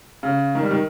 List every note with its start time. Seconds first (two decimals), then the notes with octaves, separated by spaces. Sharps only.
0.23 C#3
0.55 D#3
0.63 G3
0.71 D#3